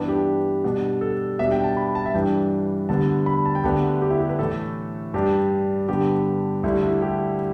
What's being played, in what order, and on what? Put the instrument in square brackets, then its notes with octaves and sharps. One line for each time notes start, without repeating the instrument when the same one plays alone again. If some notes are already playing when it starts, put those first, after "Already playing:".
Already playing: [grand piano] G2 E3 B3 D4
G4
B2 G3 D4
A4
B2 G3 D4 E5
G5
A5
B5
A5
E5
G2 E3 G3 D4 G5
D2 D3 G3 B3 A5
B5
A5
G5
D2 D3 B3 D4 G4
G4
E4
G4
B4
A2 E3 A3 A4
G2 G3 D4 G4
G2 D3 G3 B3 G4
D2 D3 G3 D4 E4
E4
G4